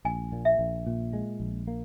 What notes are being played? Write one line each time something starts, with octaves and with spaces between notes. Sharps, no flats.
A#1 G#5
A#2
E5
A#1
A#2
G#3
A#1
A#3